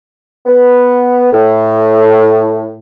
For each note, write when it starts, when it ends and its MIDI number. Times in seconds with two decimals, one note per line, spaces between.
0.46 1.31 59
1.32 2.76 45